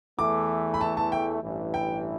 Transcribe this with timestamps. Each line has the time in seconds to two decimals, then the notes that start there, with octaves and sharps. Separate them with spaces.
0.19 E2 E3 A3 D6
0.74 B5
0.81 A5
0.97 A5
1.12 G5
1.43 A1 G2 E3
1.74 G5